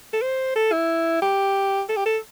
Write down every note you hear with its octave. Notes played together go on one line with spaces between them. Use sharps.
A4
C5
A4
E4
G4
A4
G4
A4